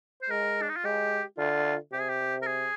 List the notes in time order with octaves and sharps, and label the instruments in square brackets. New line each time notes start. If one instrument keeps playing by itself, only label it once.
[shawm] C5
[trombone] G#3 [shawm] A#4
[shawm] D4
D#4
F4
[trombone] G#3 [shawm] G4
[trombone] D3 [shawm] F4
[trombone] C3 [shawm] G4
[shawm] G#4
G4
A#4
G#4